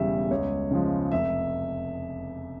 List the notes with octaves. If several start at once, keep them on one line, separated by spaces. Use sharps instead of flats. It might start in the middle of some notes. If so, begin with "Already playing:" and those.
Already playing: E1 E2 C#3 G3 E5
C#2 C#5
C#3 F3 G#3
F1 E5